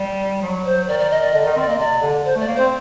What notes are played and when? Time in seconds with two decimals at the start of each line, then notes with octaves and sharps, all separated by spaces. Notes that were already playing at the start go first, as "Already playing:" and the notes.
Already playing: G3
0.42 F#3
0.65 C5
0.88 D#3 D5
0.99 D5
1.11 D#5
1.22 D5
1.31 D3 D#5
1.41 D#3 D5
1.50 D#5
1.56 C4 D5
1.68 A#3 D#5
1.78 C3 D5
2.02 D3
2.24 D3 C5
2.35 A3 D5
2.48 A#3
2.55 C4 C5